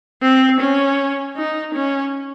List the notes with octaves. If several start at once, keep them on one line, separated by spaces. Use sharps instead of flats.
C4
C#4
D#4
C#4